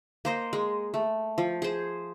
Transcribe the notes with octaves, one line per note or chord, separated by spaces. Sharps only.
A#3 C5 D#5
G#3
A3
F3
G#4 C5